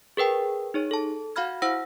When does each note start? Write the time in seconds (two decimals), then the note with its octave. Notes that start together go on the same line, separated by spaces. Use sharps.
0.17 G#4 A#4 B4 G5 A5
0.74 D#4 G#4 C#5
0.91 A4 A5
1.36 F#4 F5 F#5 B5 F6 G#6
1.62 E4 C5 F#5 E6 A#6